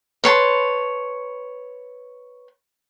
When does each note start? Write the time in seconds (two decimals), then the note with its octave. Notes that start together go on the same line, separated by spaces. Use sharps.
0.24 B4 C#5 A5 C6